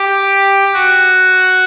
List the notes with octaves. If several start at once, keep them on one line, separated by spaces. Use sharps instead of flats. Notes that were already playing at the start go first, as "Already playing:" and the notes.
Already playing: G4
F#4